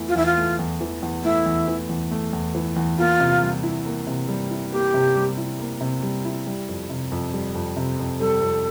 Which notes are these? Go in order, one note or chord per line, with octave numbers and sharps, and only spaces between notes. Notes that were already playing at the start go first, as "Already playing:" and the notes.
Already playing: E2 E3 A3
F4
E2 E4
F4
A3
E2
E3
E2
A3 E4
E2
E3
E2
A3
E2
E3
E2
A#3 F4
C3
G3
E4
A#3
C3
G3
E4
A#3 G4
C3
G3
E4
A#3
C3
G3
E4
G3
F2
C3
F2
G3
F2
C3
F2
G3 A4
F2